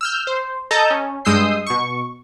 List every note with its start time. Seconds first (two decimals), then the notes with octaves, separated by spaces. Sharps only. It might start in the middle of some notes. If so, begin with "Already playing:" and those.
0.01 E6 F6 G6
0.27 C5
0.71 A4 D#5 A5 A#5 G6
0.90 C#4
1.25 G2 G#3 D#6 E6 G6 C7
1.66 B2 C#6